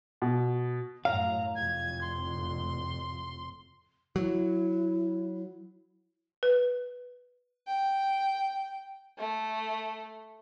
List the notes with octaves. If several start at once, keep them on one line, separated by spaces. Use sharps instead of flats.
B2
F#2 A2 F#3 F5 A#5
F1 F2 A2 G#6
C6
F#3 E4
B4
G5
A3